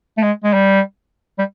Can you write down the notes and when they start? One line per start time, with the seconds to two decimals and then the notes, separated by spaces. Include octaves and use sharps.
0.18 A3
0.23 G#3
0.44 G#3
0.54 G3
1.39 G3